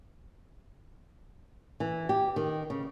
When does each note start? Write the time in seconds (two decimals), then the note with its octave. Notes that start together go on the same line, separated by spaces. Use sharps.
1.80 E3
2.09 G4
2.36 D#3
2.70 C#3